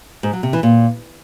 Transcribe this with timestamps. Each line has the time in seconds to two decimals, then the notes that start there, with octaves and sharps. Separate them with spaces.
0.23 G#2
0.33 F#3
0.43 C3
0.53 E3
0.63 A#2